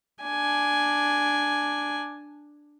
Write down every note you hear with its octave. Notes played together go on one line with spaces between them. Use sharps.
D4 G#5